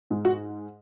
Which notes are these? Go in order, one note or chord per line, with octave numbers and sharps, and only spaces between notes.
G#2 G#3
F#4